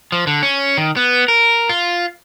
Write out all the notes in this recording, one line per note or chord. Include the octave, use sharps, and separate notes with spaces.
F3
D3
C#4
D#3
B3
A#4
F4